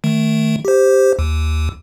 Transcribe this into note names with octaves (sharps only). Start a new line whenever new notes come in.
D#3 A3
G4 C5
D#2